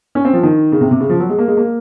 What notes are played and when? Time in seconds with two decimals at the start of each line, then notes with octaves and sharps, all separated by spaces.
0.15 C#4
0.25 C4
0.33 F3
0.43 D#3
0.72 C#3
0.81 C3
0.91 C3
1.00 C#3
1.09 F3
1.20 F#3
1.29 G#3
1.38 A#3
1.48 G#3
1.57 A#3